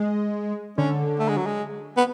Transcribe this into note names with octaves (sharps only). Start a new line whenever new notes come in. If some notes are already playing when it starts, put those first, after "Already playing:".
Already playing: G#3
D3 C#4
A3
G#3
F#3
G#3
B3